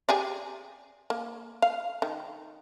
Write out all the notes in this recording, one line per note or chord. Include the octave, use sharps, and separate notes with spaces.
G4 G#4 D5
A#3
F5
D#3